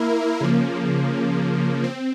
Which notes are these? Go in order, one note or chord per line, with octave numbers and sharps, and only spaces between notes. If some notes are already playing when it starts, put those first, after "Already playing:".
Already playing: A#3 E4 A#4
C#3 F3 A#3
C4